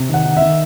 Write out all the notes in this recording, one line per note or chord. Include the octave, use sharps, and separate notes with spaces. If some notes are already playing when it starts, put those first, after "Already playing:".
Already playing: C3
D#3 F#5
D#3
E5
D#3